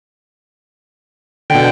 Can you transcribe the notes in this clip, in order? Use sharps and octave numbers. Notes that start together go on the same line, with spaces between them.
B2 D3 G5